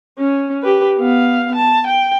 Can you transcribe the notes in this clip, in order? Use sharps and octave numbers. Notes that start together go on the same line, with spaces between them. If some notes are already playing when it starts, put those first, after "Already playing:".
C#4
G4 B4
B3 F5
A5
G5